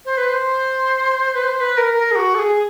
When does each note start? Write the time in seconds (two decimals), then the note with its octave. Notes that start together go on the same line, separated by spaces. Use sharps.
0.05 C5
0.17 B4
0.29 C5
1.35 B4
1.42 C5
1.60 B4
1.77 A#4
1.94 A#4
2.11 G#4
2.15 F#4
2.35 A4
2.38 G#4